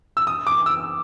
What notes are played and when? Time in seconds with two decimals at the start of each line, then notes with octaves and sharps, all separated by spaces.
0.17 E6
0.27 D#6
0.47 D6
0.66 E6